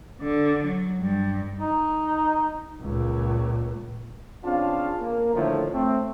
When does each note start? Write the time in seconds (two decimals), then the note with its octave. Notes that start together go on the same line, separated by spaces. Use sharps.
0.21 D3
0.63 F#3
0.99 G2
1.59 D#4
2.81 C#2 A#2
4.44 C#3 C4 D4 F4 F5 A5
5.00 A#3
5.34 A2 D3 D#3 F3 A3
5.72 A3 C4